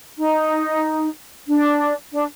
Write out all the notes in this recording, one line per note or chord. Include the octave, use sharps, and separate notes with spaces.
D#4
D4
D4